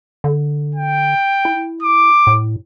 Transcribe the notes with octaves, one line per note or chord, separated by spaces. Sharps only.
D3
G5
E4
D6
A2